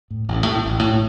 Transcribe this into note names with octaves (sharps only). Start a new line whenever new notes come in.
A2
A1
A2
A1
A2